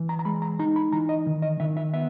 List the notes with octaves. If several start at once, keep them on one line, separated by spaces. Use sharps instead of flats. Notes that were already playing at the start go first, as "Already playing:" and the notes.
Already playing: E3
A#5
A#5
G#3 B5
A#5
D#4 A#5
B5
E3 A#5
D#5
D#3
D#5
D#3 E5
E5
B3 E5